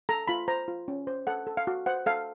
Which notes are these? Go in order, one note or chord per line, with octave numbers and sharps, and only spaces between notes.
A4 A#5
F4 B5
C5 A#5
F4
C#4
C5
A4 F#5
A4
F5
F#4
C5 F#5
A4 F5